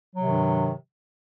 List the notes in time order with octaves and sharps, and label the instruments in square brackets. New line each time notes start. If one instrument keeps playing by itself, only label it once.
[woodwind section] F#3
C3
D#3
G2